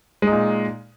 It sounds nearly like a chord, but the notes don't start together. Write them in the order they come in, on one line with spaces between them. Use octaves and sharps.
G#3 D#4 A#2